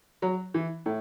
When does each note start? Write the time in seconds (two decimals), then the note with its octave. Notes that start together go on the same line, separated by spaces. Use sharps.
0.22 F#3
0.54 E3
0.86 A2